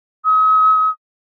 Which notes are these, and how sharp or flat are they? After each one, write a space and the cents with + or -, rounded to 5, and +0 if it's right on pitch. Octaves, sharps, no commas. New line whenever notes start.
D#6 +40